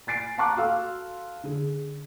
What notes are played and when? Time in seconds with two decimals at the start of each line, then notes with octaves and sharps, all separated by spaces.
0.07 G#5 A6 C7 D7
0.38 F#5 A5 A#5 C#6 D6 F#6
0.57 F#4 A4 F5 C6 E6
1.43 D3 G#4